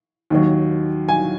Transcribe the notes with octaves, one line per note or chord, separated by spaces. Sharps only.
D#2 D#3 F#3
G#5